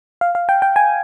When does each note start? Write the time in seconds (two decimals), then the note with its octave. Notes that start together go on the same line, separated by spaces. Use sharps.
0.21 F5
0.35 F5
0.49 G5
0.62 G5
0.76 G#5